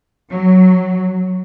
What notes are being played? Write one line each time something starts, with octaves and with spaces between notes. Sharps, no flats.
F#3